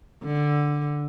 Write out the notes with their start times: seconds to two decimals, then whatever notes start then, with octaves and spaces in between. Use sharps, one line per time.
0.24 D3